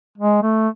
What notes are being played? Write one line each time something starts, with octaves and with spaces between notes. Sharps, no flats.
G#3
A3